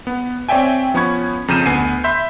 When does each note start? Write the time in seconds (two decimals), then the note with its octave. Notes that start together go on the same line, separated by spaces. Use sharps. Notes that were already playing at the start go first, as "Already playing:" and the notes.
0.07 B3
0.49 C4 C#5 D5 E5 G5 G#5
0.94 F3 B3 C#4 B5 C#6 G#6
1.48 F2 C#3 A#5 G6 D#7 E7
1.66 D2 B3 G#5 C7 D#7
2.04 E5 B5 C6 G6